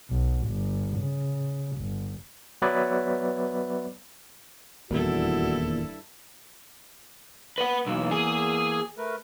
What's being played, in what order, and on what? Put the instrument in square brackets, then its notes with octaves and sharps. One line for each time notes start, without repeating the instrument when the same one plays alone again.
[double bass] B1
G1
C#3
G1
[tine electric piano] F#3 B3 B4 C#5 D5 E5
[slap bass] D#1 [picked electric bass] E2 A#2 [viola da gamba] G2 E4 A4 [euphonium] F#4
[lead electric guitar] B4 F#5
[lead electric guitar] B1 [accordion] E2 A#3 E6
[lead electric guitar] G#4 G#5
[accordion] A3 A#4 B4